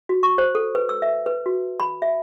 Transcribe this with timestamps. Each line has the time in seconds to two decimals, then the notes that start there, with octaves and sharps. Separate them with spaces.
0.09 F#4
0.23 C#6
0.38 C5
0.55 A4
0.75 B4
0.89 E6
1.02 E5
1.26 B4
1.46 F#4
1.80 B5
2.02 E5